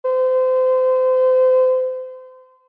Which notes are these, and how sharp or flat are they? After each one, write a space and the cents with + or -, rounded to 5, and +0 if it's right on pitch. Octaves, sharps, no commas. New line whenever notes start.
C5 -30